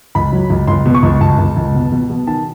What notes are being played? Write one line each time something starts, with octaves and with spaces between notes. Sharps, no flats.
C#2 B5
F#3
C#2
C#2 C6
B2
C#6
C#2
C#2 A5
C#2
C#2
B2
B2
B2
D#3 A5